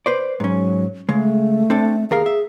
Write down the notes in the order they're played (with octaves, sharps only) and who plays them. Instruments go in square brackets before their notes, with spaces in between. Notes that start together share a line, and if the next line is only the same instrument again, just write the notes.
[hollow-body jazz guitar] B4 C5 D5
[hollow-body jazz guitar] G#2 C#4 [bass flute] F#3
[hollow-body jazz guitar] C#3 G#3 [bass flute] A3
[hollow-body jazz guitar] C4 D4 A4
[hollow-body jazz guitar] D#2 A#4 F5 [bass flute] G#4
[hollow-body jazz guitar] E5